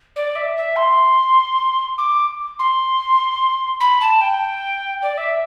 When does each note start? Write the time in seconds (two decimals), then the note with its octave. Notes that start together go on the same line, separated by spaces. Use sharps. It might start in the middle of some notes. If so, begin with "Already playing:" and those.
0.16 D5
0.36 E5
0.57 E5
0.76 C6
1.98 D6
2.59 C6
3.80 B5
4.01 A5
4.21 G5
5.02 D5
5.18 E5